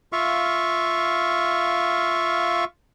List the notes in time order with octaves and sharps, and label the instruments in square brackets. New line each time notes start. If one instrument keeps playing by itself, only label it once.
[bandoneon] F4 E5 F5 C#6